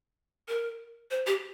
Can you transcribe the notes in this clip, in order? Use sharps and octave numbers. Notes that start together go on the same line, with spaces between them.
A#4
C5
G4